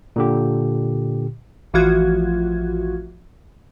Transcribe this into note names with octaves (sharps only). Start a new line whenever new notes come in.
A#2 D3 G4
A1 E3 F3 F4 F#4 G#6